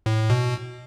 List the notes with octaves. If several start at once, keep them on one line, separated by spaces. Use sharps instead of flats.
A2
B2